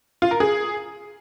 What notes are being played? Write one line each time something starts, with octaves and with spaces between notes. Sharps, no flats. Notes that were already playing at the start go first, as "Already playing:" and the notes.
F4
A#4
G#4